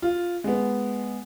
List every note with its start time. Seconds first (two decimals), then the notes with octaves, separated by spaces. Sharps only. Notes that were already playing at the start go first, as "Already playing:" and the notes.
0.02 F4
0.44 G#3 B3